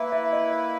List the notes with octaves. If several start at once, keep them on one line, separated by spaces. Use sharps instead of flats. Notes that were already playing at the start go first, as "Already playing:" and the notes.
Already playing: A#3 E4 B4 E5
E5
D#5